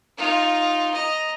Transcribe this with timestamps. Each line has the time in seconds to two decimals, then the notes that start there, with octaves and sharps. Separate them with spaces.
0.18 D#4 F4
0.94 D#5 A#5